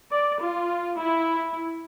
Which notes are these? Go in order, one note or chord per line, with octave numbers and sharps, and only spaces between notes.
D5
F4
E4